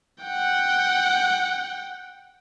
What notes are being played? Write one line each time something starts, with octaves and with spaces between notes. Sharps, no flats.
F#5 G5